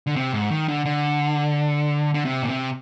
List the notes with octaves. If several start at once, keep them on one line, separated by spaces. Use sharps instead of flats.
D3
C3
G#2
D#3
D3
D3
D3
C3
A#2
C3